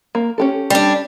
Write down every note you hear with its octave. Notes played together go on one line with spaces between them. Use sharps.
A#3
C#4 G4 A4
G3 D4